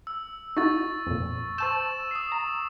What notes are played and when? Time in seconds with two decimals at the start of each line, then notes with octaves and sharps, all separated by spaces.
0.07 E6
0.57 D#4 E4 F#4 C#6 A6
1.07 F2 A#2
1.58 C5 A5 C#6 E6 G6 E7
2.11 D#6 C7
2.32 A#5